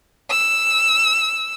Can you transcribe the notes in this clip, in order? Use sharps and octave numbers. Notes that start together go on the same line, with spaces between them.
E6